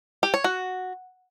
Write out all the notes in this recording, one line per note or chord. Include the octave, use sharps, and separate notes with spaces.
G4
C#5
F#4